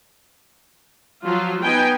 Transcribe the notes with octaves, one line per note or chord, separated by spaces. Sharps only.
F3 F#3 F4
B3 D#4 G5 G#5